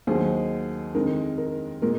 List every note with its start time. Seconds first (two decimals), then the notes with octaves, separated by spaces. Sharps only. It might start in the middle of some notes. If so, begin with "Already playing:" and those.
0.07 D#2 D#3 F#3 G#4 C5
0.95 F2 D#3 G#3 A#4
1.38 A#4
1.82 A#2 G#3 A#4